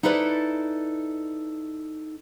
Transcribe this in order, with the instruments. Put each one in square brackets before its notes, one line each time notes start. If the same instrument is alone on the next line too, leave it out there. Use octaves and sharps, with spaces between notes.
[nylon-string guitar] D#4 E4 A4 B4 D5